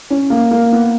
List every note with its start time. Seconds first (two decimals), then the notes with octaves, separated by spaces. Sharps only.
0.10 C#4
0.30 A#3
0.51 A#3
0.72 B3